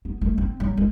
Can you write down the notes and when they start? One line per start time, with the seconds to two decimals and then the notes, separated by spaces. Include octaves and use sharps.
0.05 B3
0.21 A3
0.38 C4
0.60 F#3
0.77 G#3